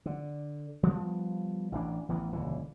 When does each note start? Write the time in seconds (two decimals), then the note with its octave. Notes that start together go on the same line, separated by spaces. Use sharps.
0.06 D3
0.83 F3 G3 B3
1.72 A1 E3 D4
2.09 A1 E3 B3
2.32 D#1 C#2 D3 E3